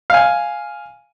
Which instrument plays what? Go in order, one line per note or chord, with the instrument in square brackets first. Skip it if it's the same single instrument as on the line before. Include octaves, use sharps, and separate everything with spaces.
[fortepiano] F5 G#5